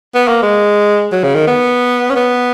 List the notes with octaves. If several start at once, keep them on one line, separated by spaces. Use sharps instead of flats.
B3
A#3
G#3
F#3
C#3
D#3
B3
C#4
B3